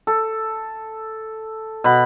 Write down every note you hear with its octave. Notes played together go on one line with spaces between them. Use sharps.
A4
B2 B5